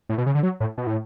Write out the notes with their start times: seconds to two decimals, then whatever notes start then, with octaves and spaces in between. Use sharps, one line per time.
0.09 A2
0.18 B2
0.26 C#3
0.35 D3
0.43 F#3
0.60 A2
0.78 B2
0.87 A2